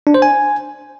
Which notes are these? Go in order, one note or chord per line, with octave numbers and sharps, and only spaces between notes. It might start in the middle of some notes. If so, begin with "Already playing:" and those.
D4
C5
G#5